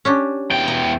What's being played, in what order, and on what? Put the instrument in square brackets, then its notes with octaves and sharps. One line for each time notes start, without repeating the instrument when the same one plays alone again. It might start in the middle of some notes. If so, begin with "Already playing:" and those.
[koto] C#4 D4 G4
[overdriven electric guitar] E2 G5
[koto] A#5